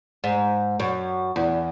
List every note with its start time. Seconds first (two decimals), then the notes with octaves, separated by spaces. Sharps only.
0.24 G#2
0.80 F#2
1.36 E2